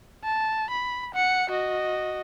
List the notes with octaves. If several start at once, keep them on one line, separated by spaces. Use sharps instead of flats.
A5
B5
F#5 C#7
F#4 D#5